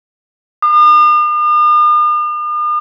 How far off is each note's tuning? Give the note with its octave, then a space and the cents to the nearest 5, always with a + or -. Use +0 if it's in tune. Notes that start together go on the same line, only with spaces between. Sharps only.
D#6 -45